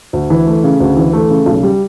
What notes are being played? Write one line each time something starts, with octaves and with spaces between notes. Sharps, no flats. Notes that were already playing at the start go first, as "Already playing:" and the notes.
D2
E3
A3
C#3
D2
E3
A3
C#3
B1
G3